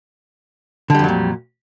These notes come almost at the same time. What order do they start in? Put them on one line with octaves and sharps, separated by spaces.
D3 G3 F2 F#3 A#2